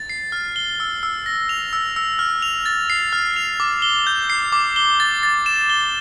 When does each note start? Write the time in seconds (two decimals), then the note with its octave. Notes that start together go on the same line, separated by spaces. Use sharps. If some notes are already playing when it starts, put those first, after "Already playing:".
Already playing: A6
0.09 C7
0.32 F6
0.56 G7
0.80 E6
1.03 E6
1.26 A#6
1.49 F7
1.73 E6
1.96 E6
2.19 F6
2.42 F7
2.66 A6
2.90 C7
3.13 F6
3.36 F7
3.60 D6
3.82 G7
4.07 G6
4.30 C7
4.52 D6
4.76 G7
5.00 A6
5.23 A6
5.46 E7
5.70 G7